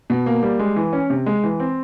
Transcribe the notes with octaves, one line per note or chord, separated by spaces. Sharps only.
B2
A#3
G3
G#3
E3
C#4
C3
G#3
E3
C4